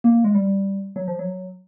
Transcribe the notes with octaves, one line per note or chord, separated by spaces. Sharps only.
A#3
G#3
G3
F#3
F3
F#3